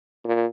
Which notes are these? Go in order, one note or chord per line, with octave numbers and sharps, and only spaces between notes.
A#2